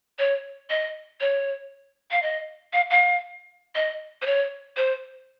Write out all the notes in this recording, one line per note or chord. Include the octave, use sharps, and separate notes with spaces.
C#5
D#5
C#5
F5
D#5
F5
F5
D#5
C5
C#5
C5